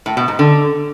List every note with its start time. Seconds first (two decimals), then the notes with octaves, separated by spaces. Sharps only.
0.06 A2
0.17 B2
0.28 G#2
0.39 D3